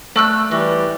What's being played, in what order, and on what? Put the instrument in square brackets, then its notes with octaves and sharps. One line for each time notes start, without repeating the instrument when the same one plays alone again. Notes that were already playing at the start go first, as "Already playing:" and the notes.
[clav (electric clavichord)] A3 [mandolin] D5 E6 F#6
[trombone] E3 [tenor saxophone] G3 [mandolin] F#4